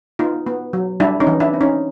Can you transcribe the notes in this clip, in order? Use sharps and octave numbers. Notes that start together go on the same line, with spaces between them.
B3 D#4 F4
B3
F#3
G3 D4 E4
C#4 D#4
E3
D4 E4
C4
C#4 D#4